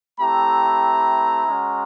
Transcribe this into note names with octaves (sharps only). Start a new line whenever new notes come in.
A3 C4 E4 G4 A#5
G#3 C#4 F#4